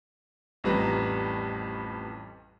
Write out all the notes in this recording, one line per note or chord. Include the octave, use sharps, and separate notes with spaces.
A1 F2 G3 B4 A#5